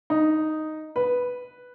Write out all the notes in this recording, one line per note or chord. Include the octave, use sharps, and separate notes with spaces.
D#4
B4